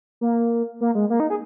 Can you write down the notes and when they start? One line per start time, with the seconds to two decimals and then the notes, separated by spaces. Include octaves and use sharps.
0.21 A#3
0.81 A#3
0.95 G#3
1.10 A#3
1.20 D#4
1.30 G#4